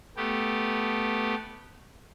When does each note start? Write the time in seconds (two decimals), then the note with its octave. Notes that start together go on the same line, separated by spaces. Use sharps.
0.17 A3 B3 G4